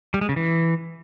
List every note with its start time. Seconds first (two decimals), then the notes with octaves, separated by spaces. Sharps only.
0.14 G3
0.21 G#3
0.29 C#3
0.36 E3